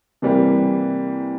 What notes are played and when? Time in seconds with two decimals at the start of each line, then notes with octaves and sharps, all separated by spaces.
0.22 C3 E3 G3 A#3